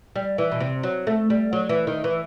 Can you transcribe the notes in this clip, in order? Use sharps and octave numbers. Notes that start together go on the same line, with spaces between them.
G3
E3
B2
C3
F#3
A3
G3
F#3
E3
D#3
E3